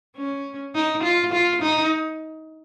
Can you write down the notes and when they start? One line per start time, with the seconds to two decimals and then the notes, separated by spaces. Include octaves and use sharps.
0.16 C#4
0.75 D#4
1.03 F4
1.32 F4
1.62 D#4